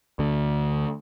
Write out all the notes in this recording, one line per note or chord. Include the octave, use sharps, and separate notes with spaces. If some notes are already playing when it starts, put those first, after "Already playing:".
D2 D3